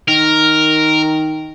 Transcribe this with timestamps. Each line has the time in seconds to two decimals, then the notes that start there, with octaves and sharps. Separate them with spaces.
0.08 D#3 A#4